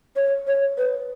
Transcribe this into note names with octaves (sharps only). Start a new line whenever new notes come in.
C#5
C#5
B4